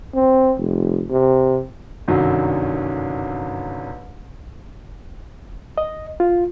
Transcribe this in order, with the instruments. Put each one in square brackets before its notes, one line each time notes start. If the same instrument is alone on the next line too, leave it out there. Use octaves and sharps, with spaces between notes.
[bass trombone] C4
F1
C3
[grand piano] G1 C2 F#2 D3 D#3 F#3
[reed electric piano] D#5
F4